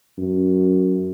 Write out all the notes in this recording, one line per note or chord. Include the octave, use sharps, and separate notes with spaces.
F#2